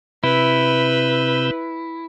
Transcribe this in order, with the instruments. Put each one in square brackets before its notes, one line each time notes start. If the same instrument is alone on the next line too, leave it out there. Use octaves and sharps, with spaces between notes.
[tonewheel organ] C3 E6 G6 [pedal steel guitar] E4 [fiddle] B4